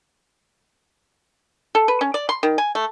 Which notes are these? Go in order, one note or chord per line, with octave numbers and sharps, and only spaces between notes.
A4
B4
C#4
D5
C6
D#3
G#5
A3